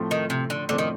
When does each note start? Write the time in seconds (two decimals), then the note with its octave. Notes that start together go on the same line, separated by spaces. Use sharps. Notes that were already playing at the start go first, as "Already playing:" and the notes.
Already playing: A2 F3 A3 C4
0.11 D#3
0.30 C3
0.50 D3
0.68 A2 D3 F3 A3 C4
0.78 D#3